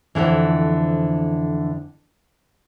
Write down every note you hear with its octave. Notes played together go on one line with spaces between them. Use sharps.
F2 B2 D3 E3